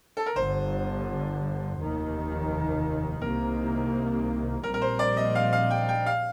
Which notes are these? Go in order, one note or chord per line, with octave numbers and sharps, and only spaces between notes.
A4
A#4
G1 G2 D3 C5
F1 D#2 D#3
C2 C3 D#3 A#3 A#4
A#1 A#2 G3 C4 A#4
A#4
C5
D5
D#5
F5
F5
G5
G5
F5